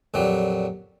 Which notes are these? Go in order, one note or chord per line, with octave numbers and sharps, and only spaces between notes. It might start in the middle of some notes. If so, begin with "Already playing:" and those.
F2 A#2 F#3 G3